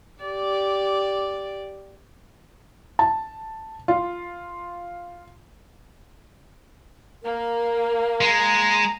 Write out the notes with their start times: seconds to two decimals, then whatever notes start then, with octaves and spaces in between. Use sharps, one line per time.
0.23 G4 D5
2.99 A5
3.88 F4
7.23 A#3 A#4
8.21 G#3 A#5